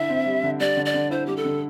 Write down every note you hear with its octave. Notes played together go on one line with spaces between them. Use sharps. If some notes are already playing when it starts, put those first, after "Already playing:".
Already playing: D3 E4 E5
C4
G3
D3
G3 D5
D3
D5
D3
E4 C5
G3 G4
A4
D3